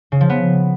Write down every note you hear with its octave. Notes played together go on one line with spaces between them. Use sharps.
C#3
F3
B3